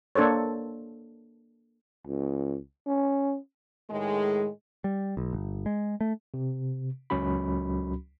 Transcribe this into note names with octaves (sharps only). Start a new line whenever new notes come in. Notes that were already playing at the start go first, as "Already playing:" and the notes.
A#3 D4 A4 C5 C#5
C#2
C#4
A2 D#3 G#3
G3
B1
G1
G#3
A3
C3
C#2 F#3 C#4 F#4 B5